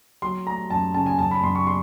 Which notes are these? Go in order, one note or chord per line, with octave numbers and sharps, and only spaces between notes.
F#3 C6
A3 A#5
F#2 A5
C#3 A5
G#5
F#2 A5
B5
F#2 C6
C#6
C6